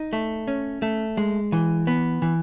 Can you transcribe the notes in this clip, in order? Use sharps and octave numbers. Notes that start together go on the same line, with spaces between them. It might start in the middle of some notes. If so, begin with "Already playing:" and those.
Already playing: D#4
A3
C#4
A3
G#3
E3
B3
E3